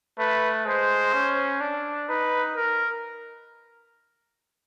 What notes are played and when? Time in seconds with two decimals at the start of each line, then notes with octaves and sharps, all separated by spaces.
0.19 A3 B4
0.66 G#3 C5
1.14 C#4
1.61 D4
2.09 D#4 B4
2.57 A#4